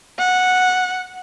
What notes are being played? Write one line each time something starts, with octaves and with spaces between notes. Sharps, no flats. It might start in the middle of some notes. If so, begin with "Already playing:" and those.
F#5